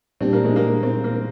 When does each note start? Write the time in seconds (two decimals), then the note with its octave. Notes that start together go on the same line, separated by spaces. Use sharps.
0.21 A#2 G3 C4 D4 G4
0.33 A#3
0.44 G#3
0.56 A#3
0.83 C4
1.04 A#3